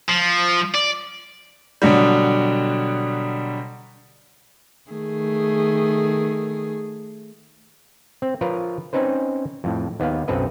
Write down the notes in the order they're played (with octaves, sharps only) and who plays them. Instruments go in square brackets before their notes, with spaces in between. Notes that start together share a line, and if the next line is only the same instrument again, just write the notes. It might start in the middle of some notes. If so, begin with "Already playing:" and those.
[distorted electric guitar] F3
D5
[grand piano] B2 D3 F#3 G3
[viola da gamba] D#3 A3 G#4
[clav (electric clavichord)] C4
F3 F4 A#4 B4 C#5
C4 C#4 D#4 B4 C5
F2 A2
D#2 B3 B4 F5
B1 F#2 C4 A4 B4 D#5